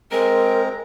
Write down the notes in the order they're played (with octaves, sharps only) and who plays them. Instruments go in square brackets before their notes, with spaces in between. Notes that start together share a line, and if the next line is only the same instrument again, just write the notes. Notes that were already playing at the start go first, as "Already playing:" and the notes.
[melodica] G#3 C4 A#5 [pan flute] A#4